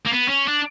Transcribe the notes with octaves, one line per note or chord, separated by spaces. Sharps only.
A#3
B3
C#4
D4